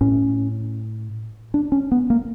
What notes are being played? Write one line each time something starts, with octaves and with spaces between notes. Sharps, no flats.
A2 C#4
D4
C#4
B3
A#3